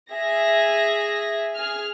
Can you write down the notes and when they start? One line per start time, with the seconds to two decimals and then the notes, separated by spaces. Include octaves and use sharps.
0.12 G#4 E5 A#6
1.54 G#4 F6